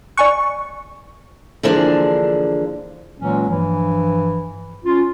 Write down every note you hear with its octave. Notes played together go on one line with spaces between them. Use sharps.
D5 G#5 C#6 F#6
D3 E3 F3 A#3 D4 G#4
A#2 E3 F#3 G#3 A#3 C#4
G2 E3 F3
C#4 F4